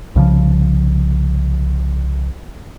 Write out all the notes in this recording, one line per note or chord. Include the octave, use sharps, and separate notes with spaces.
C2 C#3 F3